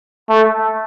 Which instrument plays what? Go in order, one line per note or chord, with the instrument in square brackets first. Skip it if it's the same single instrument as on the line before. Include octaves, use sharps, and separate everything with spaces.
[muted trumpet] A3